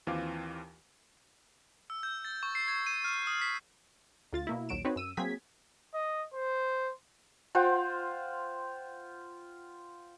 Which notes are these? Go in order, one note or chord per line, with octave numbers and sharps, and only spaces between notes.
D#2 E3 C4 F4 F5 D6
E6
G6
A6
C#6
C7
G#6
D#7
F6
D#6
B6
D2 F4 A6
B2 A#3 E4
A#1 D#2 F#3 D7 E7
C4 D#4 F#4 B4 C#5
F#2 E6 D#7
F#3 A#3 C4 G#4 G#6 B6
D#5
C5
F4 C5 F#5 G5